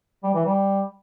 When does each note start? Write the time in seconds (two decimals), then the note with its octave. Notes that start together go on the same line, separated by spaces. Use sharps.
0.24 G3
0.35 E3
0.46 G3